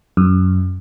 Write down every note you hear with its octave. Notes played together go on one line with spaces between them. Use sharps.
F#2